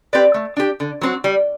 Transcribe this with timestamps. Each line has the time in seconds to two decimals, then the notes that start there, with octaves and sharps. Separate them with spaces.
0.13 C4 G4 B4 D5
0.34 A3
0.57 D4 G4
0.80 D3
1.01 F#3 C4 F#4
1.24 G3